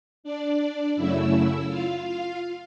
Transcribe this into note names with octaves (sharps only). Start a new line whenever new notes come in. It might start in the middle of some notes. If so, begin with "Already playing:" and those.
D4 D5
F#2 C#3 F#3 A3 E4 E5
F4 F5
F4 F5